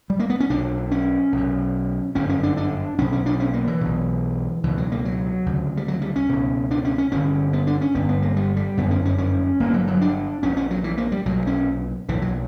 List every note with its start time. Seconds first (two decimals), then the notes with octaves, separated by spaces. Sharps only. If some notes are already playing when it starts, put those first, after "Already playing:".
0.10 G3
0.19 A#3
0.30 B3
0.40 C#4
0.50 B1 B2 D4
0.91 C#4
1.32 B1 B2
2.15 G1 F#2 D3 C#4
2.29 C#4
2.43 D4
2.57 D4
2.98 B1 B2 C#4
3.12 C#4
3.26 D4
3.40 C#4
3.53 A#3
3.67 E3
3.81 B1 B2
4.63 C#2 B2 E3
4.78 F#3
4.92 A#3
5.05 F#3
5.46 D2 C#3
5.77 G3
5.88 F#3
6.02 G3
6.16 C#4
6.29 C#2 B2
6.71 D4
6.85 C#4
6.98 C#4
7.12 G1 G2 D3 C#4
7.53 B3
7.67 D4
7.81 C#4
7.94 G1 G2 D3 B3
8.09 B3
8.22 A#3
8.37 G3
8.57 G3
8.77 G1 F#2 D3 B3
8.91 C#4
9.05 C#4
9.18 C#4
9.60 G1 G2 D3 A#3
9.74 F#3
9.88 F#3
10.01 D4
10.43 A#1 A#2 C#4
10.57 C#4
10.71 F#3
10.84 E3
10.98 A#3
11.12 G3
11.25 B1 A#2 F#3
11.47 C#4
12.09 B1 A#2 E3
12.22 F#3